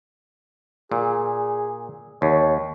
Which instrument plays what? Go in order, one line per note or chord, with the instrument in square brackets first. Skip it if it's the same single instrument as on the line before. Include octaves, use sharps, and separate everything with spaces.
[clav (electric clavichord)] A#2 [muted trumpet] G#4
[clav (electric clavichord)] D#2 [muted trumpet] C#5